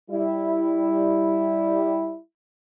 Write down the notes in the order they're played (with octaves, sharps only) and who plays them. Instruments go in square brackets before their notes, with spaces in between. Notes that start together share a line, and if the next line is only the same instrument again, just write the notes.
[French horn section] G3 E4